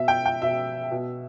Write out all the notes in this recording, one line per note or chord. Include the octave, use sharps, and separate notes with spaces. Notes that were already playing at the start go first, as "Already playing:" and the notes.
Already playing: B2 E5
G5
G5
B2 E5
B2